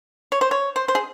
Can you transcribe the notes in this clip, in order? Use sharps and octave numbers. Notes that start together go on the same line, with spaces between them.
C#5
C5
C#5
C5
C5
G#4